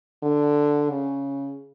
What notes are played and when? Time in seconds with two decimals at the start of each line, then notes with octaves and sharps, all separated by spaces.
0.23 D3
0.90 C#3